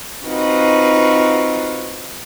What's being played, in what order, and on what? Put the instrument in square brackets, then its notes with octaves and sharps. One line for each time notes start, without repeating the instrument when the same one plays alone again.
[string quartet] C4 D#4 F4 F#4 B4